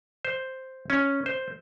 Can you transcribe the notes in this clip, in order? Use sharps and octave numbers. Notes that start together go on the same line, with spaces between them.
C5
C#4
C5